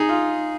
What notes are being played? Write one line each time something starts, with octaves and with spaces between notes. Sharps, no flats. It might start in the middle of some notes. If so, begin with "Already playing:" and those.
Already playing: D#4 G#4
F4